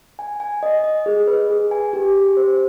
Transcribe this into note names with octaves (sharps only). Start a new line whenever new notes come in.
G#5
G#5
D#5
D#5
G#4
B4
G#4
G#5
G4
G4
C5